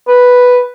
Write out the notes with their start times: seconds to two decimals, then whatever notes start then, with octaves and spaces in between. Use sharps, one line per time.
0.09 B4